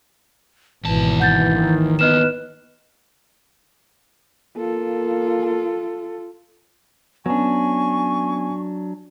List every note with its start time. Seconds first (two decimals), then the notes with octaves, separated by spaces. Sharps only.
0.85 G#1 D#2 B2 E3 A5
1.20 F#5 G6 A6
1.56 D#3
1.99 D#2 B3 B4 D#5 F6 E7
4.57 A#3 F4 A4
7.26 F#3 B3 C#4 D4 G#5 C#6